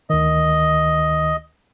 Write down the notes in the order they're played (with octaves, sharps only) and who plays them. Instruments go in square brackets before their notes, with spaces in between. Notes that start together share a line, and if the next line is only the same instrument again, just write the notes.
[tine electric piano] D2 D#3 [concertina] D#5